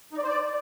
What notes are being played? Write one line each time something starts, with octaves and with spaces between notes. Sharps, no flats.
D#4
D5
C5
D5